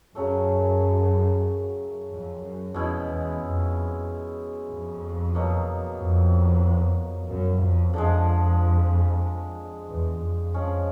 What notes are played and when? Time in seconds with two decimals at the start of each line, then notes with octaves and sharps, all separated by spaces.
0.15 F#2 C#3 F#3 A3
2.10 F2
2.42 F#2
2.74 F2 B2 G#3 C#4 E4
3.06 E2
3.40 F2
4.69 F2
5.35 B2 F#3 A#3 D#4
5.99 F2
7.29 F#2
7.62 F2
7.93 F2 D3 F3 G#3
9.88 E2
10.21 F2
10.54 F3 G#3 C#4